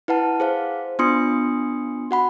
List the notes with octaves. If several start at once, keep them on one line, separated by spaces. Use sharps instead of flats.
E4 B4 F#5 A5
G#4 C5 F5
B3 D4 F4 C6 D#6 C#7
F#4 F#5 B5